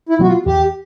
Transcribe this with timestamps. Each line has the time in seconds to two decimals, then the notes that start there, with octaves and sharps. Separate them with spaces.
0.09 E4
0.19 B2 F#3 B3 F#4
0.28 F4
0.46 E2 G4